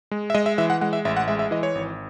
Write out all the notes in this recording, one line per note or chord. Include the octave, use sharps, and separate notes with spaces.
G#3
E5
G#3 D#5
E5
E3 E5
F#5
G#3 F#5
E5
A1 E5
F#5
G#3 E5
E5
E3 D#5
C#5
G#1